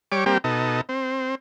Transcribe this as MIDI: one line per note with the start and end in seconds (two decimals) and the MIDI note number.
0.12 0.24 55
0.12 0.24 73
0.12 0.24 86
0.26 0.38 55
0.26 0.38 58
0.26 0.38 60
0.26 0.38 67
0.44 0.81 47
0.44 0.81 63
0.44 0.81 69
0.89 1.35 60